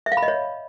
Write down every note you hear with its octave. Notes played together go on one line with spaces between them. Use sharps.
E5
F5
B5
D#5
C#5